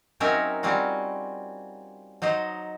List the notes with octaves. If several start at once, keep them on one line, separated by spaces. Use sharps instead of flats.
F#3 C4 C#4 D#4 A#4 E5
G3 C4 C#4 F4 F#4
F#3 D#4 C5 D#5